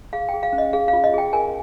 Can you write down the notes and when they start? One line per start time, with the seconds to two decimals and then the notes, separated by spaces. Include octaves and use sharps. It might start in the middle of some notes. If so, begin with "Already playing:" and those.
0.13 G#4 F5
0.29 G5
0.34 G#4
0.43 F5
0.53 C#4
0.58 D#5
0.73 G#4 F5
0.88 F5
0.93 F4
1.04 D#5
1.14 G#4 G5
1.33 A#4 G#5